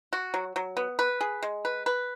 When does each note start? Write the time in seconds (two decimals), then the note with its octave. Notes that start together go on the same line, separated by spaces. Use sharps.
0.13 F#4
0.34 F#3
0.56 F#3
0.77 B3
0.99 B4
1.21 G#4
1.43 G#3
1.65 B4
1.86 B4